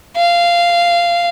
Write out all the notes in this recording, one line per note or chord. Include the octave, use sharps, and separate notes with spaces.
F5